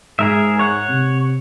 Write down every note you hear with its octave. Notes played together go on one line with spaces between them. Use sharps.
G#2 G#4 A#4 E5
C#5 F#5
C3